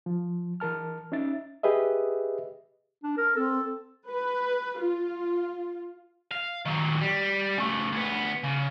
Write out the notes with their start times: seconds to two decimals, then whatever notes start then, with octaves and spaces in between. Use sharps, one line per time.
0.06 F3
0.60 E3 A#4 A5 F6
1.12 C#4 D#4 E5 A6
1.63 G4 G#4 B4 D#5 E5
3.03 D4
3.17 A#4
3.36 C4 A4
4.09 B4
4.80 F4
6.31 F5
6.65 D#3 F#3
7.01 G3
7.58 C#3 A3
7.92 D2 B3
8.43 C#3